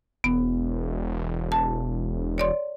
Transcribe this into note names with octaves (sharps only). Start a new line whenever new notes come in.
E1 B3
A5
C#5 D5 C6